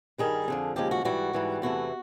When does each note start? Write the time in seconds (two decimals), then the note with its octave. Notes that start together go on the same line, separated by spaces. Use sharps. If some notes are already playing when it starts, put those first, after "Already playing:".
0.18 G2 D#3 G3 G#4
0.48 F2 D3 F3
0.76 D#2 C#3 F3 G#3 G4
0.91 F#4
1.05 G#2 E3 G3 F#4
1.33 G#2 E3 G3
1.62 E2 C3 E3 A3 F#4